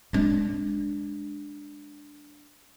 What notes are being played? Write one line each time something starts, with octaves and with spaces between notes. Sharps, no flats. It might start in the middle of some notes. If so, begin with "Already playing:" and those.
G#3 D4